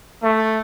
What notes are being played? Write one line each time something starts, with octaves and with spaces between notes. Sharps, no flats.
A3